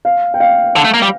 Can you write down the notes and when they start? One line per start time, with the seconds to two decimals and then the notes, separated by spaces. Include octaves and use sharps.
0.05 F5
0.34 G5
0.40 F5
0.76 D3
0.85 A3
0.94 A#3
1.02 G3